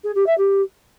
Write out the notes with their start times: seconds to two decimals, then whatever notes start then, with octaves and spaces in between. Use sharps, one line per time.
0.04 G#4
0.15 G4
0.27 E5
0.38 G4